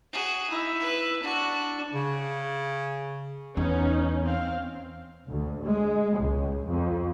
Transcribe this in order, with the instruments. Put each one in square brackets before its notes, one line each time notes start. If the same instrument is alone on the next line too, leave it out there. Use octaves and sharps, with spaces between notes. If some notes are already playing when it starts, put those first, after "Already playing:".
[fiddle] F#4 G#4
[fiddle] D#4 [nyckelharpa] E4 E5
[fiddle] B4
[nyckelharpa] D4 [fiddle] F#4
[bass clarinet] C#3
[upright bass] E2 [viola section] B3 C#4 D#4
[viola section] C4 F5
[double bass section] D2
G#3
C#2
F2